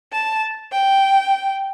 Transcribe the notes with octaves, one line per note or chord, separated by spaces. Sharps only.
A5
G5